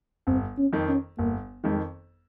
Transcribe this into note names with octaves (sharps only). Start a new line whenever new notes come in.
G1 C4
C#4
F2 D#3
C#4
G1 A#3
F2 D#3 G#3